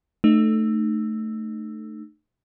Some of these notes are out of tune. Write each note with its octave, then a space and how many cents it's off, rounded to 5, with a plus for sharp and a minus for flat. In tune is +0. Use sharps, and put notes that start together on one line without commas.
A3 +0 D#4 -35